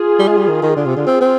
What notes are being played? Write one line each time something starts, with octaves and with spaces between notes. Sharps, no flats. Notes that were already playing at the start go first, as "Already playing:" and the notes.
Already playing: F4 G#4
G3
G#3
G3
D#3
D#3
D3 F4 G#4
C3
D3
C4
C4